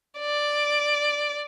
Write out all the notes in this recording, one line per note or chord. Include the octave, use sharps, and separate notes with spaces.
D5